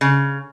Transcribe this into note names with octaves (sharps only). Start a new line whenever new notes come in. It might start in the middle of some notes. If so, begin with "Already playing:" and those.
C#3